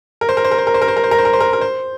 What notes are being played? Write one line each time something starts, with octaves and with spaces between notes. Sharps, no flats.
A#4
C5
A#4
C5
A#4
C5
A#4
C5
A#4
C5
A#4
C5
A#4
C5
A#4
C5
A#4
A#4
C5